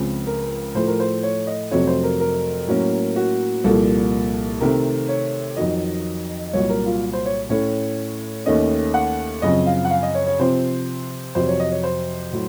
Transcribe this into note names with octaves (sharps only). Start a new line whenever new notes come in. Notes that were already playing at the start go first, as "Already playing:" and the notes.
Already playing: C#2 C#3 F3 C4
A#4
A2 F3 A3 C5
A#4
C5
C#5
D#5
F2 C3 F#3 A3 C4 C#5
C5
A#4
A#4
A2 F#3 A#3 C#4
F#4
C2 A#2 F3 A#3 A4
C3 D#3 A3 C4 A#4
C#5
F2 D#3 F#3 D#5
C2 A#2 F#3 C#5
A#4
F4
C5
C#5
A2 A3 C#4 C#5
D#2 D#3 A3 C#4 D#5
F#5
F#2 C#3 F3 C4 D#5
F5
F#5
F5
D#5
C#5
C#5
C3 F3 C4 C5
F2 C3 F#3 C5
C#5
D#5
C#5
C5
A2 F#3